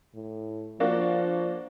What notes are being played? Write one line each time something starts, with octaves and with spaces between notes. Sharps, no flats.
A2
F3 A#3 D4 F#4